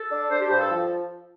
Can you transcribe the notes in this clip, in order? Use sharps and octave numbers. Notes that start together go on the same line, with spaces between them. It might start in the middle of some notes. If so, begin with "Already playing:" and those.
Already playing: A4
D4
D4 C5
G4
G2 C5
A4
F3